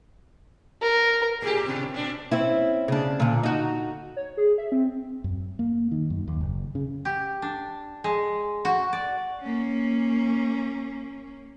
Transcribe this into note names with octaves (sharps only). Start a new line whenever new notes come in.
A#4
A2 G4 G#4
A2 C3 C4
A#2 D4
C4 C#4 E4
C#3 D4
A#2 D3
D#4 F#4
C#5
G#4
E5
C4
F#2
A#3
D#3
F#2
D#2
F#1
C#3
G4
D4
G#3
F#4
D5
A#3 C#4